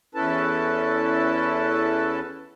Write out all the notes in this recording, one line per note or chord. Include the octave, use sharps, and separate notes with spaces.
E2 C#4 E4 A4 B4 A5